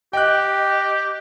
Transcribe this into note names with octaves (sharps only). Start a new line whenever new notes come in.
G4 D#5 G5 F#6